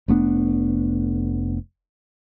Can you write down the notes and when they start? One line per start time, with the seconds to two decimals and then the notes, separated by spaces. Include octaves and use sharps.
0.08 F1 A3 B3 D4